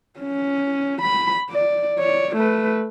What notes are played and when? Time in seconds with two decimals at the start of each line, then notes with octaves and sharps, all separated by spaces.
0.19 C#4
1.02 B5
1.50 D5
1.98 C#5 D5
2.36 A3 B4